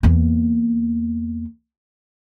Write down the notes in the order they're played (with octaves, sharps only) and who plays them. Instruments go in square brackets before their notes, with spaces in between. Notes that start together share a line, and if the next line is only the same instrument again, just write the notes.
[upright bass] E2 A#3